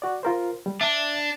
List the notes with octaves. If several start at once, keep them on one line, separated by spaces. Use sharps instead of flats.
F#4 D5
F4 A#4 C5
G3
D4 E5 A5